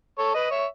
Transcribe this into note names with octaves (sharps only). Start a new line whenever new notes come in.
A4 C#5
B4 D#5
C#5 E5